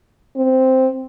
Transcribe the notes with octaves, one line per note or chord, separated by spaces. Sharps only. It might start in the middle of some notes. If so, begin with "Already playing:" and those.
C4